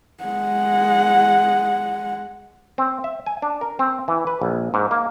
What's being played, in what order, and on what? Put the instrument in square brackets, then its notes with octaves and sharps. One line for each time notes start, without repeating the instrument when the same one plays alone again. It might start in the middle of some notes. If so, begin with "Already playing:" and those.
[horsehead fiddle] G#3 F#5
[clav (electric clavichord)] C4
E5
G#5
D4
A#4
C4
E3
B4
A#1
G#2
A#3